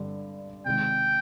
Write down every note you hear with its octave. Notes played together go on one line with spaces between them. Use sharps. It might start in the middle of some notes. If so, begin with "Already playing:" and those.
Already playing: G2 D3 G3
C3 D#3 G#3 G5